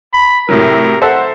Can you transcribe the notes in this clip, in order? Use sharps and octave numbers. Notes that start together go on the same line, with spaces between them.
B5
A2 C3 F#3 A#4
A4 C5 E5 F#5